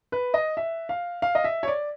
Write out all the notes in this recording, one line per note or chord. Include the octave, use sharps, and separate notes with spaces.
B4
D#5
E5
F5
F5
D#5
E5
C#5
D5